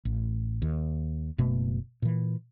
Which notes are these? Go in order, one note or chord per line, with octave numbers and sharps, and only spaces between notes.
A1
D#2
F#1 B2 A3
A#2 E3